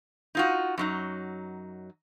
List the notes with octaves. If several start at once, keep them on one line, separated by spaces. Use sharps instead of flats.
D#4 F4 F#4
F#2 F#3 D#4